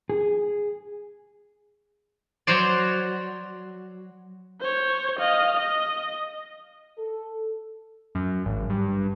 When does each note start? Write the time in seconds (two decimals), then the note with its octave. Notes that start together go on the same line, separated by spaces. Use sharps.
0.10 G#4
2.47 F#3 F#4 C5 D5
4.61 C5 C#5
5.19 D#5 F5
5.57 D#5
6.98 A4
8.15 F#2
8.45 G#1
8.70 G2